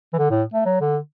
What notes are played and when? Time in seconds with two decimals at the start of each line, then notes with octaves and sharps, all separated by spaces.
0.13 E3
0.18 D3
0.30 A2
0.54 A3
0.65 F#3
0.81 D3